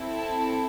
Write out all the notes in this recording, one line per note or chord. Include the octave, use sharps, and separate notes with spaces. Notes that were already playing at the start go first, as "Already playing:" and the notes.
Already playing: C4 E4 A4
A5